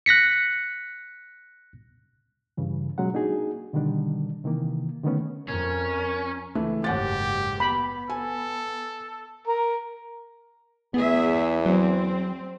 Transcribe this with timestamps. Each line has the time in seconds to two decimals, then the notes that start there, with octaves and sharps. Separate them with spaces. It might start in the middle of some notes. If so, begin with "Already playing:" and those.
0.06 F#6 A#6 B6 C#7
2.57 G2 C#3 E3
2.98 B2 F#3 G#3 C#4 F#5
3.13 A#3 D4 D#4 F#4 G#4
3.73 B2 D3 D#3 G3 D4
4.44 C3 D#3 E3 A#3
5.03 D3 D#3 A3 B3 C#4
5.48 F2 C#4 A#4
6.55 C#2 E3 A3
6.84 F#1 D#2 G#2 G4 F#5 A6
7.60 B3 B5
8.10 A4 G#5
9.48 A#4
10.94 E2 B3 G#4 E5
11.66 F#3 C4